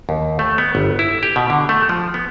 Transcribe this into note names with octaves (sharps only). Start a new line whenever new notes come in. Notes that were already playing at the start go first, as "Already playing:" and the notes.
D#2
A3
B3
G1
E4
G4
B2
D3
A3
F3
B3